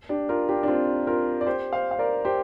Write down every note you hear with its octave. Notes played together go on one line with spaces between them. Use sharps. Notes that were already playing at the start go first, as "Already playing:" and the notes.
D4 G4
F4 A#4
D4 G4
D4
C4 F4
F4 A#4
D5
G4 C5
C5 F5
F5
A#4 D5
G4 C5